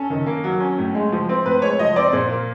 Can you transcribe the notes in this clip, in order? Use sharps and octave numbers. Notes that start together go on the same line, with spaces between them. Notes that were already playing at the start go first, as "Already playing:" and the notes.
Already playing: C#4 A4
D#3
A#3
F#3
C#4
A2
G#3
F3
C4
A2 B4
G#3 C#5
F3 D#5
C4 D5
A#2
A#3